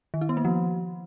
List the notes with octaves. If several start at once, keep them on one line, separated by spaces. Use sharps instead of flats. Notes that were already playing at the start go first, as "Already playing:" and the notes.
D#3
E4
B3
A#3
F3